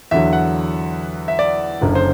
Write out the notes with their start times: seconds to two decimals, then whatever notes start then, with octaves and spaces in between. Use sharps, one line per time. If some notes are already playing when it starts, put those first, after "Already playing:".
0.11 E2 D3 F#3 E5
0.33 F#5
1.28 E5
1.39 D5
1.81 F#1 F#2 D3
1.95 C5